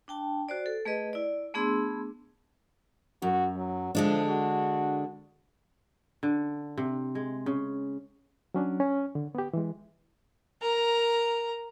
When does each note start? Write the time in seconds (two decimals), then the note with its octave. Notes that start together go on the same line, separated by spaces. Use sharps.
0.08 D4 G5 A5
0.49 F#4 C5 D5
0.66 A4
0.85 A3 G#4 B4 D#5
1.13 E4 D5
1.54 A3 B3 D4 G#4 C6 E6
3.22 F#2 F#4
3.57 F#3
3.95 D3 F3 G#3 D4
4.28 F#4
6.23 D3
6.78 C3
7.15 G#3
7.46 C#3
8.54 F#3 C#4 D4
8.80 C#4
9.15 D3
9.35 B3 G4
9.53 E3 G#3
10.62 A#4 A#5